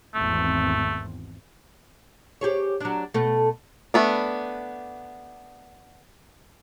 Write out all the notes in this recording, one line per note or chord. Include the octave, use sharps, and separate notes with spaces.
G#1 E2 A3 C4
G4 G#4 C#5
F#3 D4
B2 A3
A3 B3 D4